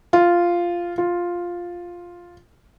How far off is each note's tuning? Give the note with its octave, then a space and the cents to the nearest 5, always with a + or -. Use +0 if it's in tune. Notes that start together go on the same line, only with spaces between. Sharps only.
F4 -5
F4 +5